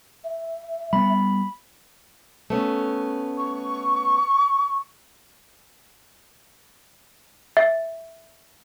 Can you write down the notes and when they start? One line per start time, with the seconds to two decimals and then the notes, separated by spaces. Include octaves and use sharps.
0.24 E5
0.93 G3 A3 B3 B5
2.50 A3 B3 C#4
3.38 C#6
7.57 E5